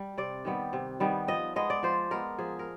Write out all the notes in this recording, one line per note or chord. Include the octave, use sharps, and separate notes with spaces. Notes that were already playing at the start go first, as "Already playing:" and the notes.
Already playing: G3
C3 D5
D#3 G3 B3
C3
D#3 G3 B3
F3 D#5
G#3 B3 D#5
D5
F3 C5
G#3 B3 A#4
F3 G#4
A#4